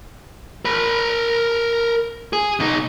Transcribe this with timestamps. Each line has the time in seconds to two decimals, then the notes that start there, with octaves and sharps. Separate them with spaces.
0.65 A#4 B5
2.33 G#4
2.60 B2 D#4